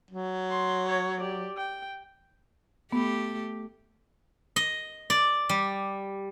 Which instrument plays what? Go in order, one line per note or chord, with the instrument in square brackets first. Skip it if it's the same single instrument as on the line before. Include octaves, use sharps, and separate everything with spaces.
[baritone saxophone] F#3
[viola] C6
C#5
G4 D5
G5
[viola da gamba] A3 G4 [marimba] B3
[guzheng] D#5
D5
G3